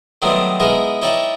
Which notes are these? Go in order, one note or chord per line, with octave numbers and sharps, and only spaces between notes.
D#3 F#3 G3 A3 B3 C4
G#3 B3 D#4 E4 G#4 A#4
D#4 E4 C#5 D5 G5 A5